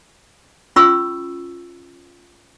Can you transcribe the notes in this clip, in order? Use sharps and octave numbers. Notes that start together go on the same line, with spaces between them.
C#4 F4 B5 C#6 E6